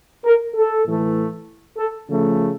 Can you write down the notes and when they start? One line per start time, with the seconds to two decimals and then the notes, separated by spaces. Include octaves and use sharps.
0.24 A#4
0.55 A4
0.85 A2 E3 A3
1.77 A4
2.07 C#3 F3 A3